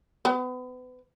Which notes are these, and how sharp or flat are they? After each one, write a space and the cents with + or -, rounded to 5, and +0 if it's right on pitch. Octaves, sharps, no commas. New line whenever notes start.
B3 +35